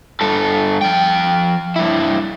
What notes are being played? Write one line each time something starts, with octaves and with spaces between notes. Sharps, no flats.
G2 A4
F3 G5
G2 E4